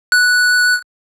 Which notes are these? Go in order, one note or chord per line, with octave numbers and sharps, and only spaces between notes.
F#6